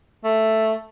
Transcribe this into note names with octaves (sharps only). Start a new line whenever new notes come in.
A3